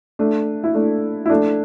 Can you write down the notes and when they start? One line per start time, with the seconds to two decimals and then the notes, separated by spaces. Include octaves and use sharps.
0.19 A3 D4
0.64 E4
0.74 A3 D4
1.26 E4
1.30 A3 D4